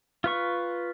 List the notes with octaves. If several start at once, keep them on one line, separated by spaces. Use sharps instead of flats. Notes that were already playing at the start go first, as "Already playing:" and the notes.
F4 B4 C#6